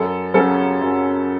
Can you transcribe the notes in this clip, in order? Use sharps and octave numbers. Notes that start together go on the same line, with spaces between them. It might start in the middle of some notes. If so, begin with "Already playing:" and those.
Already playing: F#2 A4
C#3 F#3 C#4 A4
F#2